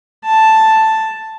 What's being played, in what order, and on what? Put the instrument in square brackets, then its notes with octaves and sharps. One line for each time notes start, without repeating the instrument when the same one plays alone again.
[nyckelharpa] A5